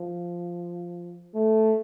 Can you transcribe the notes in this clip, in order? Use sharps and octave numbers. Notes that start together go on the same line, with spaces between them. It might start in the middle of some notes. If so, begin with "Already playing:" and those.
Already playing: F3
A3